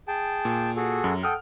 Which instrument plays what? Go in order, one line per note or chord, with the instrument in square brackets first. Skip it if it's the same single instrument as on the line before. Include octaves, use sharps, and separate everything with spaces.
[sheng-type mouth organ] G#4 G5 A5
[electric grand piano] A#2
[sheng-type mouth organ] F#4 G#4 A4
[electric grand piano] F#2
[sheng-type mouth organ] A4 G5 [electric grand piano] F#5 D#6 F6